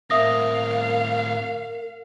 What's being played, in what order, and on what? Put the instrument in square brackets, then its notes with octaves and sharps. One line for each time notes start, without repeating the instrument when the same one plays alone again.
[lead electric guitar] A2 C4 [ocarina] A#4 [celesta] E5 D#6 A#6 [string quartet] F5